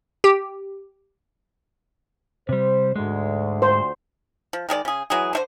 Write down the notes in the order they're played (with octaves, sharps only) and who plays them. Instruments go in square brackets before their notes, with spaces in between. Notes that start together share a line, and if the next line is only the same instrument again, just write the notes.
[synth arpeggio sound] G4
[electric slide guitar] C3 G3 [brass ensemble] C5
[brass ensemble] D2 [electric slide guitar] G#2 G#3
[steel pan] C5
[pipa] F3
D#3 G#3 G#4 D5
C#3 G#4
E3 F#3 G#3 G#4
D3 A3 C5